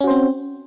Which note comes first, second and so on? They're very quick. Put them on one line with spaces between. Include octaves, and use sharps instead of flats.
C#4 F#4 C5 C4